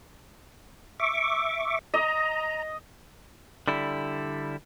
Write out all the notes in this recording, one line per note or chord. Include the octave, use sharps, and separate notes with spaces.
E5 C#6 D6
D#5 A#5
D3 G3 E4